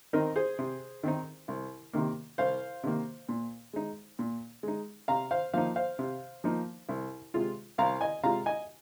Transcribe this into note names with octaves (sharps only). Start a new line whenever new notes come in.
D#3 C4 D#4 A#4 D#5
G#4 C5
C3
D#3 C4 D#4
C2
C3 D#3 A#3
C2 C5 F5
C3 D#3 A#3
A#2
G#3 D#4
A#2
G#3 D#4
C3 F5 A#5
C5 F5
F3 A#3 D#4 C5 F5
C5 F5
C3
F3 A#3 D#4
C2
C3 G#3 F4
C2 F5 A#5
D#5 G#5
C3 G#3 F4 F5 A#5
D#5 G#5